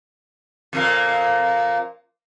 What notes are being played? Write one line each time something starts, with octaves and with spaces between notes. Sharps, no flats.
F2 A#2 A#3